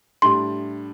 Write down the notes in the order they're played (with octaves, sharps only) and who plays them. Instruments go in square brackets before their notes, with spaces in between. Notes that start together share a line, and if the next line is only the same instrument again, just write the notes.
[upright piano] A2 G3 D4 G4 [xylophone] C6